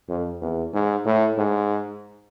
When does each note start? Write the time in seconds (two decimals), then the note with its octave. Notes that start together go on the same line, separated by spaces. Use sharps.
0.09 F2
0.42 E2
0.73 G#2
1.05 A2
1.38 G#2